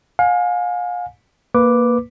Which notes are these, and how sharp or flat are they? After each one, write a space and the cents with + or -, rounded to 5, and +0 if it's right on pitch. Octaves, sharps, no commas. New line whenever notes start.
F5 +35 G#5 +5
A#3 +0 B4 +0 D6 +0